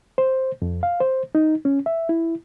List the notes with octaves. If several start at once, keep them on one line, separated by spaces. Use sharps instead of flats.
C5
F2
F5
C5
D#4
C#4
E5
E4